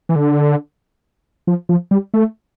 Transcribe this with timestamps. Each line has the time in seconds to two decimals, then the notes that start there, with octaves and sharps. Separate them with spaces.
0.09 E3
0.16 D3
1.47 F3
1.69 F3
1.91 G3
2.14 A3